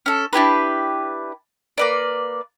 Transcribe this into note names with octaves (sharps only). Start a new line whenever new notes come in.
C#4 A4
D4 E4 G4 B4
A#3 B4 D5